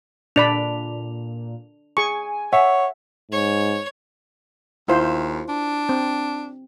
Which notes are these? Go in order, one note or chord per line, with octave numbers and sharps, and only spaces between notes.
A#2 D4 D5 B5 F7
G#4 G#5 C#6
C#5 E5 F#5
G#2 C#5
D#2 E4 F4 C5
D4
C4